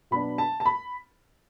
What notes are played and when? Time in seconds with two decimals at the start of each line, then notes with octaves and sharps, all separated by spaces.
0.11 B2 F#3 B3 D4 B5
0.38 A5
0.60 A5
0.66 B5